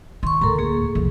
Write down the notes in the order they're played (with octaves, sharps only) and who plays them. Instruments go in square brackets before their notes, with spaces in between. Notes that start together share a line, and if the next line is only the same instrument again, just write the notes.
[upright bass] D#3 [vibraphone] C6 C#6
[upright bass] D2 A2 [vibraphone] A4 A#4 A#5
[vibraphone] A#3 G#4
[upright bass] C2 F2